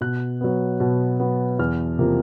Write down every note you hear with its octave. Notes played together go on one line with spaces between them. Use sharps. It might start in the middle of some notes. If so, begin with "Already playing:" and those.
B2 F#6
F#3 B3
B2
F#3 B3
E2 F6
C3 F3 A#3